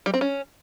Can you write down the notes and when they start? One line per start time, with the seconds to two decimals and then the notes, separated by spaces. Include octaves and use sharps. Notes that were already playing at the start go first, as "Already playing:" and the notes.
0.06 G3
0.14 C4
0.21 C#4